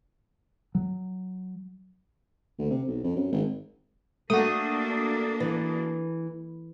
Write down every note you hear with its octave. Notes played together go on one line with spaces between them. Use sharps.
F#3
D2
C3
B1
F2
F#2
G#1
A3 A#3 D4 F#4 D#6
E3